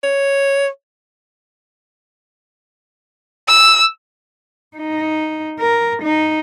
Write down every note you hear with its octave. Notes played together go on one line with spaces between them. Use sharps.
C#5
E6
D#4
A#4
D#4